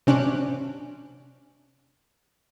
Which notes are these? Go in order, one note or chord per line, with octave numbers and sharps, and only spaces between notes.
C3 C#4 D4 F#6 D7